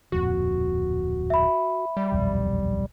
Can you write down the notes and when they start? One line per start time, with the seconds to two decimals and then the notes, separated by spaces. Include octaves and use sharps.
0.12 D1 F2 A#2 F#4
1.30 E5 B5
1.97 G3
2.12 D#1 B1 F2